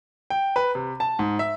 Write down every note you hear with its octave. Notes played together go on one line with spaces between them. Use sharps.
G5
B4
C3
A5
G#2
E5